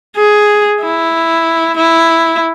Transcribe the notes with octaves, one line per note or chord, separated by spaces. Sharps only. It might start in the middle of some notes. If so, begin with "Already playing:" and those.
G#4
E4
E4